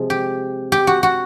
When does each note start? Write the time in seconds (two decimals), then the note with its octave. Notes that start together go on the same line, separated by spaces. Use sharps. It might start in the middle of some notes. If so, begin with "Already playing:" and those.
Already playing: C3 F3 G#3
0.10 G4
0.72 G4
0.87 F#4
1.03 F#4